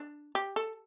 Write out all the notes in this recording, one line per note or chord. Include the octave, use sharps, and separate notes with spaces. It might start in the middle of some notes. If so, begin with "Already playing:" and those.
Already playing: D4
G4
A4